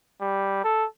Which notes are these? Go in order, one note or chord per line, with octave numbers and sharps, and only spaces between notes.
G3
A4